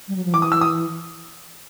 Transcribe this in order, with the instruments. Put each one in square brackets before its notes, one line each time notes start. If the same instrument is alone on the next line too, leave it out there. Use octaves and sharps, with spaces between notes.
[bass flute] G3
F#3
F3
[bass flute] E3 [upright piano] D6
[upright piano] D#6
E6
D#6